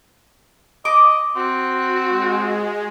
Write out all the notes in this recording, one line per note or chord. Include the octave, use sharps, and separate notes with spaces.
D#5 D6
C4 F#4
G#3